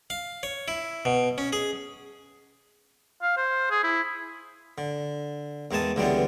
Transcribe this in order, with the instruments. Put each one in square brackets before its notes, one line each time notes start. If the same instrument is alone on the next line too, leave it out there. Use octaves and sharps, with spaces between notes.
[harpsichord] F5
C#5
E4
B2
C#4
G#4
[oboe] F5
C5
G#4
E4
[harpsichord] D3
E2 D#3 G#3 G#5 A5 D#6
C#2 D3 E3 G3 G#3 B3